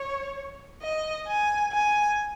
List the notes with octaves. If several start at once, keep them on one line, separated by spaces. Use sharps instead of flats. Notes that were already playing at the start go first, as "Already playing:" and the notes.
Already playing: C#5
D#5
G#5
G#5